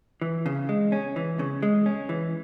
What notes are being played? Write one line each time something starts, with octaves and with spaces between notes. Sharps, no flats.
E3
C#3
G#3
C#4
E3
C#3
G#3
C#4
E3